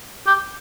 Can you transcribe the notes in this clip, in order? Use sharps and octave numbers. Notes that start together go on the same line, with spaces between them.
G4